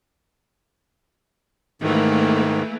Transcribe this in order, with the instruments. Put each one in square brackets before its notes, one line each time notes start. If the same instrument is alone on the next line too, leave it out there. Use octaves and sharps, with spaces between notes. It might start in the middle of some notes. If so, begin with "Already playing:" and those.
[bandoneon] G#2 D#3 [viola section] E3 A3 A#3